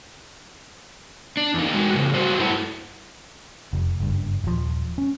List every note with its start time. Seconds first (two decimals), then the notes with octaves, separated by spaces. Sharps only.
1.37 D4
1.54 E2 D#4
1.74 G#3 F#4
1.93 A2 C#3
2.14 F#3 G3 F#4 C5
2.39 G2 A3 E4 F#5 A5
3.73 F1
4.00 F#1 G2
4.44 D#1 F3
4.98 C#4